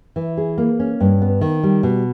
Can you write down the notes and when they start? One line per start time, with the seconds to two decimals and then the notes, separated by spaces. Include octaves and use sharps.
0.16 E3
0.37 G#4
0.58 A#3
0.80 C#4
1.00 G2
1.22 B3
1.41 D#3
1.63 G3
1.83 B2